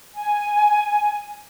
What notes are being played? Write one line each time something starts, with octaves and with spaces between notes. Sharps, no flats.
G#5